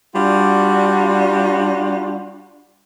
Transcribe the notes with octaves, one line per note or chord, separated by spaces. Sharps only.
G3 D4 F4 F#4